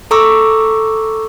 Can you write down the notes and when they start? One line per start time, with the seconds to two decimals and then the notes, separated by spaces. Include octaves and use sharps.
0.11 A4 A#5 C#6 D6 E6